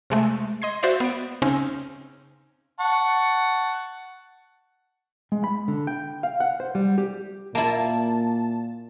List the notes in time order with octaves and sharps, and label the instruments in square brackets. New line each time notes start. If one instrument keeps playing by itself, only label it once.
[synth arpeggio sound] C3 G#3 A3
D#5 C6 G#6 C7
F#4 C5 D5 E5 F5
B3 D7
C#3 C4 C#4 D#4
[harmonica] F#5 A5 C#6
[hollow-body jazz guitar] G#3
B5
D3
G5
F5
F#5
C5
G3
G4
[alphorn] A#2 [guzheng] A#3 E4 [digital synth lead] A5